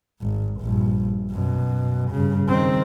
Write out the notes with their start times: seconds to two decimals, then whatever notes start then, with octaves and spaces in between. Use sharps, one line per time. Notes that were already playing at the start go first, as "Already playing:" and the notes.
0.21 G#1
0.61 A#1 G2
1.31 F#2 B2
2.11 G2 C#3
2.49 D#3 C4